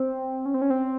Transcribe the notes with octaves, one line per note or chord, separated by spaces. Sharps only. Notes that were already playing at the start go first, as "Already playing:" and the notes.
Already playing: C4
C#4
C4
C#4
C4